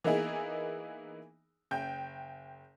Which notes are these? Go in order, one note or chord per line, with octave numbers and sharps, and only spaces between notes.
E3 A#3 B3 D#4 E4 G#4
F#1 G5 G6